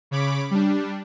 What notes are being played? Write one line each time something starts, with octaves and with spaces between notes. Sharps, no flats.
C#3 C#5 B5 D6
G3 D4